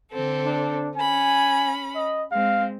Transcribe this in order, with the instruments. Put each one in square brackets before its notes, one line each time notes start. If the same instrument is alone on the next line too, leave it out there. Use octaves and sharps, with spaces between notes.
[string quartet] D3 C4 A4
[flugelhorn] D4
[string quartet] C#4 B5 [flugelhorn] G#5
[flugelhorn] D#5
[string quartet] G#3 C4 [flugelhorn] F5